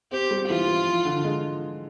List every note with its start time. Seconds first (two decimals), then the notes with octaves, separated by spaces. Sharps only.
0.11 C4 G4
0.31 G3
0.49 E3 F4
0.68 E3
0.87 F3
1.05 D3
1.24 G#3